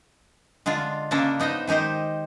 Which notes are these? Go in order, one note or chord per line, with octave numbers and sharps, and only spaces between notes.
D3 G#3 D4 F4
C#3 A#3 C#4 D4 A4 A#4
B3 D#4 C5 D#5
D#3 G#3 D#4 G4 C5